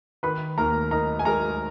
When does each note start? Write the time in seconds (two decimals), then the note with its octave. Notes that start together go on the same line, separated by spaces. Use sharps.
0.23 D#3 B4 B5
0.58 D#2 A#4 A#5
0.91 D#4 A#4 A#5
1.19 G#5
1.25 G#3 A#4 A#5